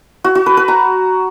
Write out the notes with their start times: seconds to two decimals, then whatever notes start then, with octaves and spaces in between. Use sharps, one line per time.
0.24 F#4
0.35 F#4
0.46 B4
0.57 B4
0.68 A#5